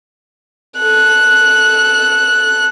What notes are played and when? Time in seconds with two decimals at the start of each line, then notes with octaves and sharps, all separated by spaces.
0.79 A4 F#6